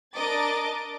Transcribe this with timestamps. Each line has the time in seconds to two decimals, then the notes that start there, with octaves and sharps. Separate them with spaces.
0.14 D4 A#4 D#5 D6 A6